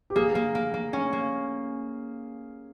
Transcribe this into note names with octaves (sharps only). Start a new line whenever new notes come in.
G4
A#3 G#4
A#3
A#3
A#3
C#4
A#3